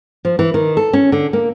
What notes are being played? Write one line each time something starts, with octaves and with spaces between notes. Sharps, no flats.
F3
E3
D#3
A4
C#4
D3
A#3